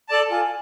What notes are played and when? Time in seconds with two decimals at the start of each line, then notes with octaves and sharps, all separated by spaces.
0.09 A4 D5 A5
0.31 F4 G#5